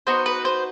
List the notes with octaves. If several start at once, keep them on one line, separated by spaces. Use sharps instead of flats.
B3 D#4 F#4 C5
B4
C5